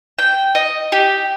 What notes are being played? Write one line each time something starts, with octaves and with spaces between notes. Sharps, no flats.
G5
D#5
G4